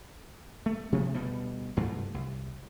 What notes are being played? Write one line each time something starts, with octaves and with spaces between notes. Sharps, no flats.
A3
C3 F3 A3 B3
D2 B2 G3 B3
C2 G2 F#3 A3
C2